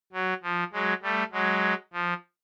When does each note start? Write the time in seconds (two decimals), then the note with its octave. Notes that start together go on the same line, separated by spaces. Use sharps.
0.13 F#3
0.43 F3
0.73 F#3 G#3
1.02 G3 A3
1.32 F#3 G#3
1.93 F3